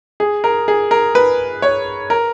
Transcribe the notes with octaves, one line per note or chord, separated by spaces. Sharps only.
G#4
A#4
G#4
A#4
B4
C#5
A#4